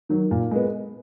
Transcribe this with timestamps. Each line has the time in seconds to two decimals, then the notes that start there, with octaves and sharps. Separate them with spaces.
0.09 D#3 F#3
0.31 A#2
0.51 G#3 B3